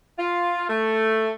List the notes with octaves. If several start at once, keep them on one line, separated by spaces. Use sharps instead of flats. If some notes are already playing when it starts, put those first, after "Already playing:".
F4
A3